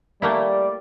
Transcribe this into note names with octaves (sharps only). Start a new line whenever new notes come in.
G3 A3 A#3 E4 D5